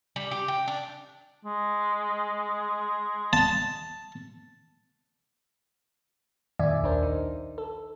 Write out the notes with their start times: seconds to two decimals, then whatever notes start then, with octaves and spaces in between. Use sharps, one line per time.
0.16 G3
0.31 G4
0.48 G5
0.68 D4
1.45 G#3
3.33 A5
6.59 F2 A#2 D#3 D5 E5 G#5
6.82 A#1 D#2 D4 A#4 C5
7.03 D#4
7.58 A4